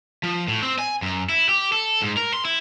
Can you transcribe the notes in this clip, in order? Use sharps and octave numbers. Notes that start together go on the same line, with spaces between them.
F3
A2
C4
G#5
F#2
E4
G4
A4
G#2
A#4
C6
E4